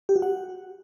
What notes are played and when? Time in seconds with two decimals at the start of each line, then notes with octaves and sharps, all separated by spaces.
0.09 G4
0.16 F#4
0.22 F#5